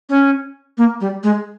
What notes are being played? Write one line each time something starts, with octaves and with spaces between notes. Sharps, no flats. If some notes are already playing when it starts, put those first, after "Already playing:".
C#4
A#3
G3
G#3